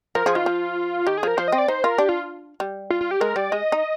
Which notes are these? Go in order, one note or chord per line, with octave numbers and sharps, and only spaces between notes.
F3 A#4
F3 G#4
D#3 F4
F3
D#3 G4
G#4
F3 A#4
F3 C5
C4 D#5
D5
D#4 C5
F4 A#4
D4 G4
F4
G3
F4
F4
G4
G#3 A#4
G3 D5
G#3 D#5
D#4